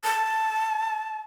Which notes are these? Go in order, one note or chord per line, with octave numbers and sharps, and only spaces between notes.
A5